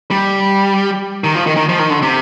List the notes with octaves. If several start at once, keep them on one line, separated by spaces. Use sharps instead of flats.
G3
D#3
F3
D#3
D#3
F3
D#3
D3
C3